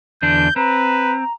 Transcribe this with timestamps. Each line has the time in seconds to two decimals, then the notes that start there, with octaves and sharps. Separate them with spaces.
0.22 E2 D3 D4 G6
0.56 C4 B4 A#5